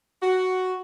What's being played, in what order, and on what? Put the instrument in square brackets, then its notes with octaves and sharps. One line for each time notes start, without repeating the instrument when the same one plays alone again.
[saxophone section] F#4